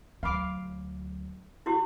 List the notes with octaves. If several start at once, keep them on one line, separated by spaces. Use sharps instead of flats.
D2 F#3 F5 B5 D6
E4 F#4 G4